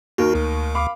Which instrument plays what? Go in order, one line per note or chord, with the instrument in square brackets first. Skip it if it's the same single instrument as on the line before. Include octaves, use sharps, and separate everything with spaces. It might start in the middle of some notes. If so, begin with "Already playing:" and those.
[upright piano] D#2 D#3 A#4 [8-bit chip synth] F#4
[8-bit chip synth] D2
[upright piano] F5 B5 D6